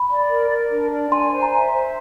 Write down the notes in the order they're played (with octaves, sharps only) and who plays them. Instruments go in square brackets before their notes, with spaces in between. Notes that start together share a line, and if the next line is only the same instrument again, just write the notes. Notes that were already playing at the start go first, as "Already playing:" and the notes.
Already playing: [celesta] B5
[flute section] D5
A#4
A#4
D4
D5
[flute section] G#5 [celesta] C6
[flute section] C5
[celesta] A#5
[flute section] E5
C5